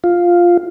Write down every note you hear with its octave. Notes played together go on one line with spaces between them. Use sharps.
F4